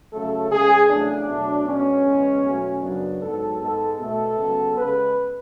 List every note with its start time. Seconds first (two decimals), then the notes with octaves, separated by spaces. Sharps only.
0.11 C#3 F#3 A3 A4
0.50 C#3 G#3 B3 G#4
0.89 E2 C#3 F#3 A3 D4
1.27 B2 F#3 A3
1.66 B2 G#3 B3 C#4
2.05 E2 C#3 G#3 B3
2.44 B2 F#3 A3
2.82 F#2 C#3 F#3 B3 D4
3.22 G#2 F#3 B3 A4
3.60 G#2 G#3 B3 A4
3.98 B2 A3 A4
4.38 C#3 F#3 B3
4.76 C#3 G#3 B3 B4